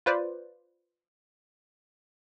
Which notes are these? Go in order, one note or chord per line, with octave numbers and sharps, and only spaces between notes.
F4 B4 C5 D5